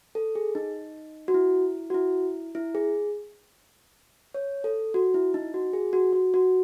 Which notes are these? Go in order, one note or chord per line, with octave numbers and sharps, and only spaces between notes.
A4
G#4
D#4
F#4
E4
F#4
E4
E4
G#4
C#5
A4
F#4
E4
D#4
F#4
G#4
F#4
F#4
F#4